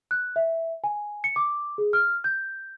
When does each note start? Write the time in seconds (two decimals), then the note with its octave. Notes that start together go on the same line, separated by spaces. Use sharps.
0.11 F#6
0.36 E5
0.84 G#5
1.24 C#7
1.36 D6
1.78 G#4
1.93 F6
2.24 G6